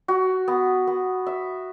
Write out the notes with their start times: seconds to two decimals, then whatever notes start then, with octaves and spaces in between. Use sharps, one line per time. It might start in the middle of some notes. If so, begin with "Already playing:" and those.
0.08 F#4
0.48 B3
0.87 B3
1.26 E5